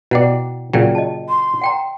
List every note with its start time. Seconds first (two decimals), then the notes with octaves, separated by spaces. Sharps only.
0.11 B2 E4 D5 F#5 G5
0.73 A#2 C#3 F#3 G5
0.95 D#5 A5
1.29 C6
1.62 F#5 G5 A#5